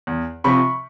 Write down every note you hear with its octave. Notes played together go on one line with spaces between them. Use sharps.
E2
C3 F3 B5 C#6